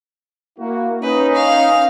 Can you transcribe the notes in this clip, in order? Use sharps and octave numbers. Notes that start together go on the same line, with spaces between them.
A#3 E4 F#4
C#4 D#4 B4
F5